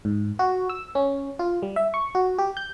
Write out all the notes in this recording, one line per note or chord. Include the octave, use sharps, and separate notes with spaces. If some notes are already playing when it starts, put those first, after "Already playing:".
G#2
F#4
E6
C#4
F4
G3
E5
C#6
F#4
G4
G6